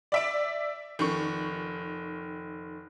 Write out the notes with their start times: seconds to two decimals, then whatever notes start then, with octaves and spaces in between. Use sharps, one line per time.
0.12 D5 E5 D7
0.99 F1 D#3 C#6